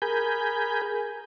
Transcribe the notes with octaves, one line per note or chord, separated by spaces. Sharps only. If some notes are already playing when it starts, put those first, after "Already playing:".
G#4 A#4 G#5 B5 G6